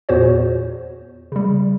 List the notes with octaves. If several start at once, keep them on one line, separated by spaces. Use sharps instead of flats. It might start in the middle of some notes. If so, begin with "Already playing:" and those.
E2 A#2 F#4 C5 C#5
C#3 G3